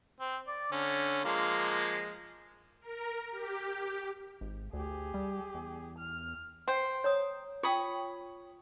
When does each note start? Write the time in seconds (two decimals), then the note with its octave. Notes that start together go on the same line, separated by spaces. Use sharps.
0.20 C4
0.47 D5
0.72 D3 C#4
1.25 F3 G#3 A#3
2.81 A#4
3.32 G4
4.41 G#1
4.73 D2 G4 G#4
5.14 G3
5.55 E2
5.98 F6
6.68 C5 F#5 G5
7.04 C#5 A#5 D#6
7.63 F4 C#5 G5 B5 D#6